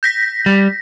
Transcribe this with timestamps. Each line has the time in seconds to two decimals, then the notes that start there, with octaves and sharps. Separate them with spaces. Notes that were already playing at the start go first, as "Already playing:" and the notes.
0.03 G6 A#6 B6
0.46 G3